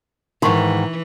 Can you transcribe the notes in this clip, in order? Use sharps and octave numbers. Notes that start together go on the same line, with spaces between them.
G#2 D#3 E3 D#4 C6 C#6